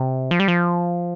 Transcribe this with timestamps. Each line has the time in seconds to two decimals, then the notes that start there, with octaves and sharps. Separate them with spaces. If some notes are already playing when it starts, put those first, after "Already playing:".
Already playing: C3
0.31 F3
0.40 G3
0.48 F3